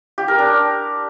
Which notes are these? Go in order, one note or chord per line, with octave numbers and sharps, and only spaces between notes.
G4
A#4
D4